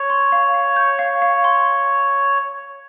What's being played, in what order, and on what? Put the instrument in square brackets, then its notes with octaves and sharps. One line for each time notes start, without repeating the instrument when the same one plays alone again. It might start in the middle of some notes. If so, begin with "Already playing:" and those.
Already playing: [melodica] C#5
[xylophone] C6
F5
F5
G6
F5
F5
C6